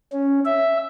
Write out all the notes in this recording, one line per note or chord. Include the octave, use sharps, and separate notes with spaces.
C#4
E5